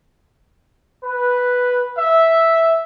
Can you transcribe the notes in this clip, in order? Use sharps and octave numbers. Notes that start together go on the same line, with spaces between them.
B4
E5